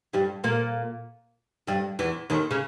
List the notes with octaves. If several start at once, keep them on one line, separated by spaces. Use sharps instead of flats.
G2 G3
A#2 A#3
G2 G3
E2 E3
D#2 D#3
C#3